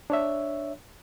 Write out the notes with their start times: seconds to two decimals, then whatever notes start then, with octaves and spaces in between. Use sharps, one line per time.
0.10 D4 C#5 E5